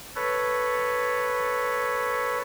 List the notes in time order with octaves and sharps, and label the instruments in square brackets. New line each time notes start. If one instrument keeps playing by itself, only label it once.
[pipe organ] A4 B4 C#5